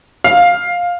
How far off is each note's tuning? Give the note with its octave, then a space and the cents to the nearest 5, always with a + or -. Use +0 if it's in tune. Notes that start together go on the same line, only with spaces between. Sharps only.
F5 +15